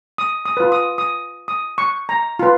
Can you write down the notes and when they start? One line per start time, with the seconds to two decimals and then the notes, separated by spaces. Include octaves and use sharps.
0.18 D#6
0.45 D#6
0.57 F4 B4
0.72 D#6
0.98 D#6
1.48 D#6
1.78 C#6
2.09 A#5
2.39 F4 B4